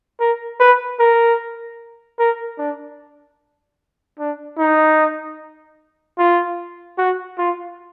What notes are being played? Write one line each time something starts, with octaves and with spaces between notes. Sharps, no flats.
A#4
B4
A#4
A#4
D4
D4
D#4
F4
F#4
F4